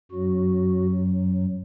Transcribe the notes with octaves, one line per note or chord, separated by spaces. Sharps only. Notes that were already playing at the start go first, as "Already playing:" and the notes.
F#2 F#3 F#4